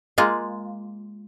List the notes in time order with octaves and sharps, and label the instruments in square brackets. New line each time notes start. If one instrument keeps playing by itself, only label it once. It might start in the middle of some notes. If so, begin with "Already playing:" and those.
[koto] G#3 A#3 F4